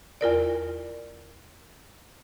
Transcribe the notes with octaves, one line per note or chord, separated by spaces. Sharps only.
E2 F4 A#4 D5